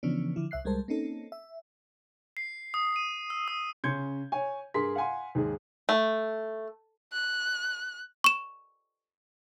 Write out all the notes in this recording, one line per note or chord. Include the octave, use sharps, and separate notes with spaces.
C#3 E3 F3 B3 C#4 D4
D3 F3 E4
C2 E5 F#6 C7
C2 G3 G#3 A#4 C5 A5
A#3 C4 C#4 D#4 A4
E5
C7
D#6
D#7
E6
D#6
C#3 C#4 C6 G6 G#6 C#7
C#5 G#5
G2 G#4 A#4 C6 B6
F5 F#5 G#5 C6
D#2 G#2 G#3 G#4
A3
F#6
C#6 E7